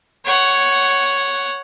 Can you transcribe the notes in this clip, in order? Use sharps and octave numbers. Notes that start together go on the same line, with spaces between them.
C#5 F#5